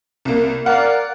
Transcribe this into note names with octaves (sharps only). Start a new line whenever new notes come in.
C2 A#3
A#4 D5 F5 F#5